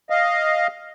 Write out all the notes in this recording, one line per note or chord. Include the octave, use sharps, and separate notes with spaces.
D#5 F5